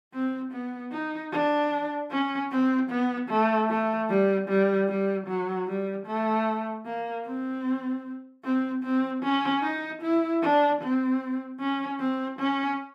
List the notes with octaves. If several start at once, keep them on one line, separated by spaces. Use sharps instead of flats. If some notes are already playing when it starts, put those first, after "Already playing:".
C4
B3
D#4
D4
C#4
C4
B3
A3
A3
G3
G3
G3
F#3
G3
A3
A#3
C4
C4
C4
C#4
D#4
E4
D4
C4
C#4
C4
C#4